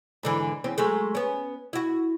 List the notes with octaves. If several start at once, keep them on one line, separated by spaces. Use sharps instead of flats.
G#2 D3 E3
E2 C4 C#4
F#3 G#3 A3
B3 C#4
E4 F#4